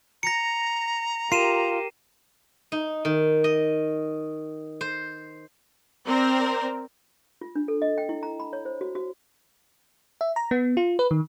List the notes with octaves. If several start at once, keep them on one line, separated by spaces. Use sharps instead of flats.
A#5 A#6 C#7
F4 G4 A#4 C7 D#7 E7
D#4
D#3
D#5
C5
C4 A#4 C5 D5
F4
D4
A4
D#5
G5
E4
A#5
B5
C#5
C5
F#4
F#4
E5
A#5
B3
F4
B4
D#3